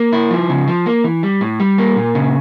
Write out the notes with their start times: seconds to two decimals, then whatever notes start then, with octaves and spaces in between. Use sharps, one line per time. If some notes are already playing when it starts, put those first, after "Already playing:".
Already playing: A#3
0.13 E4
0.30 F3
0.49 C#3
0.68 F3
0.86 A#3
1.04 E3
1.23 G3
1.41 A2
1.60 G3
1.78 A#3
1.96 A#2
2.15 C#3